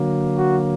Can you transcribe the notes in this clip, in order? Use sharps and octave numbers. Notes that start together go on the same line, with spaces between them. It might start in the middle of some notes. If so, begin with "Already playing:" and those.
Already playing: D3 F#3 A#3
F#4